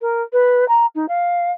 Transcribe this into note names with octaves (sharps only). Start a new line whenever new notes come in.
A#4
B4
A#5
D#4
F5